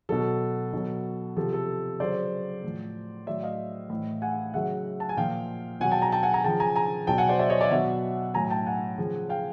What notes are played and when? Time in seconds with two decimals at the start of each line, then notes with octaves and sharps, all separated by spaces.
0.09 B2 F#3 A4
0.73 B2 F#3
1.36 C3 F3 A4
1.53 A4
2.00 C#3 F#3 C5 D5
2.63 A2 F3
3.27 A2 F#3 D5 E5
3.43 D#5 F5
3.90 A2 E3
4.22 F#5 G#5
4.53 C#3 F#3 E5 F#5
5.00 A5
5.09 G#5
5.17 A#2 F3 F5 G5
5.80 B2 F#3 F#5 G#5
5.91 G5 A5
6.01 G#5 A#5
6.12 G5 A5
6.23 F#5 G#5
6.34 G#5 A#5
6.44 C#3 F3 G5 A5
6.60 G#5 A#5
6.75 G#5 A#5
7.07 B2 F#3 G5 A5
7.18 F#5 G#5
7.29 C5 D5
7.39 D5 E5
7.50 C#5 D#5
7.61 D5 E5
7.71 B2 F#3 E5 F#5
8.34 A2 F#3 G#5 A#5
8.50 G5 A5
8.67 F#5 G#5
8.98 C#3 F3
9.29 F5 G5